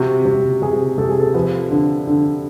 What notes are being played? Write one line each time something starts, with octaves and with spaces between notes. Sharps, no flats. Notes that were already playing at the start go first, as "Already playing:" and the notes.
Already playing: C3 F#4
C3
C3 G#4
C3 A4
G#4
A4
F3 B4
D3
D3